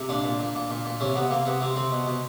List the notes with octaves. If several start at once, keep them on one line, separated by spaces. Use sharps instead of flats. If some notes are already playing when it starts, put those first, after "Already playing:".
Already playing: C3
A#2 D4
A#2
A#2
A#2
A#2
A#2
C3 C#4
C3 B3
C3 A#3
C3 B3
C3 C4
C3 C4
B2
B2